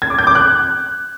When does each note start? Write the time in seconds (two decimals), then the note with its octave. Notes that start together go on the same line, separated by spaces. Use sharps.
0.02 G#6
0.10 D6
0.19 G6
0.27 D6
0.35 F#6